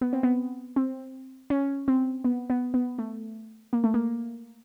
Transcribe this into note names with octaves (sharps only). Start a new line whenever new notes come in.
B3
C4
B3
C4
C#4
C4
B3
B3
B3
A3
A#3
A3
A#3